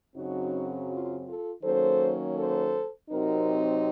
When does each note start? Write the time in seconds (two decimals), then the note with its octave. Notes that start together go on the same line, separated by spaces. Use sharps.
0.15 F#2 C#3 F#3 C4 D#4 F#4
0.89 F4
1.26 F4 A4
1.62 D#3 F#3 A#3 C#4 A4 C5
2.36 A4 C5
3.10 C3 F#3 C4 D#4 F#4 A#4